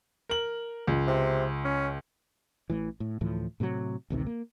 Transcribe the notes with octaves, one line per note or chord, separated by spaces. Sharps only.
A#4 F#7
C#2
C3
C#4
A1 A2 E3
A2
D2 A2 E3 F3
A2 C3 F3 F#3
A1 D2 C3 D#3
A#3